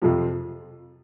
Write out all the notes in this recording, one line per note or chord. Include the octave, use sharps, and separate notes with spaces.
F2 C3 F3